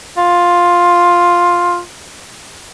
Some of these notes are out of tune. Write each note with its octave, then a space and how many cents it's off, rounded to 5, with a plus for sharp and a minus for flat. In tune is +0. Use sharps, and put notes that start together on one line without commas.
F4 +5